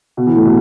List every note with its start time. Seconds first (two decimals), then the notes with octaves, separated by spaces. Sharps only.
0.17 B2
0.27 E3
0.36 A2
0.45 B2